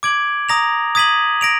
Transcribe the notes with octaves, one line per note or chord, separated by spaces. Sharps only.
D6 G#6 D7 F#7
A#5 D#6 A#6 F7
D#6 G#6 B6 D#7 F#7
A#6 D7 F7